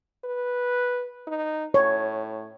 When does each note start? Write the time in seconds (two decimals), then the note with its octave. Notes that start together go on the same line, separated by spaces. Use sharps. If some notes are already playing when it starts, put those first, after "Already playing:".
0.24 B4
1.28 D#4
1.74 A2 C#5